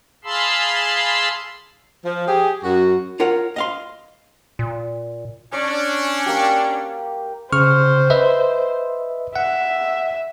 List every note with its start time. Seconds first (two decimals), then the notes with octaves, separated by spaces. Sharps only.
0.24 G#4 F5 A5 B5 C6 E6
2.04 F3
2.27 G4 G#4
2.63 F#2 F#4
3.20 F4 A#4 C#5 F#5
3.56 D#5 F5 C6
4.59 A#2
5.53 C#4 D4 C#5
6.26 A#3 G4
7.53 C#3 C5 C#6 F6
8.10 B4 D#5 E5
9.36 E5 F#5